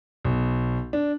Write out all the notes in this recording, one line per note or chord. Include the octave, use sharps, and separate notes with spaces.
B1
D4